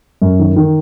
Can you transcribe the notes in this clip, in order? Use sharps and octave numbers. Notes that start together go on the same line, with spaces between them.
F#2
D#3
D#3